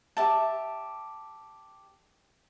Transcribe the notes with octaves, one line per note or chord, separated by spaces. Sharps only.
G4 E5 A5